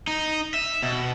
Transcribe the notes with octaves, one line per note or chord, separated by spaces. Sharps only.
D#4
E5
B2